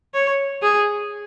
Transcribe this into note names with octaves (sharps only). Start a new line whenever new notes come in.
C#5
G#4